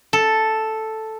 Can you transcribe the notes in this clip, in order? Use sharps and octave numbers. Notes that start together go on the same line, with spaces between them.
A4